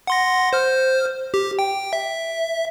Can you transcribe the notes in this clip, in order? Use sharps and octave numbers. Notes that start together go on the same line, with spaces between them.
F#5 C6 A#6
C5 F6
G4
G5
E5